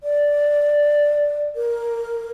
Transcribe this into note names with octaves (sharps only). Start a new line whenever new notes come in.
D5
A#4